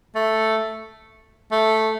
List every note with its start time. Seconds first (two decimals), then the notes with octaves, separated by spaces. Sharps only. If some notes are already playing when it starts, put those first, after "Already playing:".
0.15 A3
1.52 A3